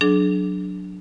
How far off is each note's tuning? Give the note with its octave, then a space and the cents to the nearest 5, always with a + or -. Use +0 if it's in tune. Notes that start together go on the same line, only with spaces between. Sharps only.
F#3 -5 D4 +0 G#4 +40